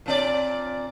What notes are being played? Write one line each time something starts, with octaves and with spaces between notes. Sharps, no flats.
A#2 C4 D5